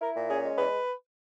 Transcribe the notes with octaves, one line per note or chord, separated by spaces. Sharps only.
E4 A#4
A#2
C#4 G#4
G#3
E2 B4